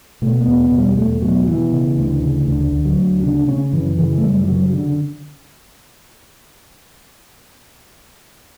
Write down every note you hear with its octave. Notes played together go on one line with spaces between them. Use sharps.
B2 A3
B3
E2
B3
B2
G3
E2 A3
B2 F#3
B2 E3
C#3
D2
C#3
D2 D3
D2
F#3
D2
C#3 D4
C#3 C#4
F#2 E3
C#3 E3
A3
F#2 G3
E3
C#3 F#3
D3